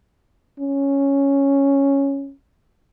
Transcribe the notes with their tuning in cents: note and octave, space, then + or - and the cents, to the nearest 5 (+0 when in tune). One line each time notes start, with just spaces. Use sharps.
C#4 +0